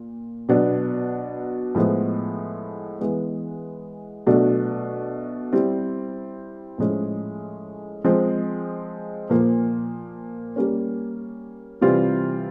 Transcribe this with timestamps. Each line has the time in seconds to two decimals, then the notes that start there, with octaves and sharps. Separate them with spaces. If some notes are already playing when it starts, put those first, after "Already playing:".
Already playing: A#2
0.49 B2 F#3 B3 D4
1.75 A2 F3 G#3 B3
3.00 E3 G#3 B3
4.27 B2 F#3 A3 D4
5.52 G3 C4 E4
6.78 A2 F3 G#3 C#4
8.05 F3 G#3 C4
9.30 A#2 F3 A#3
10.56 G3 A#3 C#4
11.81 C3 E3 G3 C4 F4